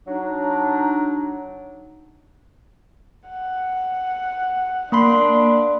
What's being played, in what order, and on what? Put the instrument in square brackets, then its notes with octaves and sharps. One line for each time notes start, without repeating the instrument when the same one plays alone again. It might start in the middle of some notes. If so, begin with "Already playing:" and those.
[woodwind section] F#3 D4 D#4
[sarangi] F#5
[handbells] A#3 B5 C6 [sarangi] D4